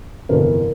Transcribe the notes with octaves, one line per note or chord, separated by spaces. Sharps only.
G1 F2 C3 E3 A#4